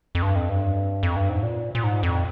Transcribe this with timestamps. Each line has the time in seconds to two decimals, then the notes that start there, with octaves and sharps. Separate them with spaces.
0.15 F2
0.22 G2
0.35 F2
0.49 G2
1.03 F2
1.16 G2
1.29 G#2
1.43 A#2
1.75 A#2
1.84 G#2
2.03 F2